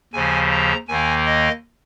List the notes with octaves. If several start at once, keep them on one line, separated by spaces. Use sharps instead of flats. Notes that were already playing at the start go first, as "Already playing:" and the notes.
D#2 C#3 F3 G#5
A#5
D#2 D#3 A#3 G#5
D#5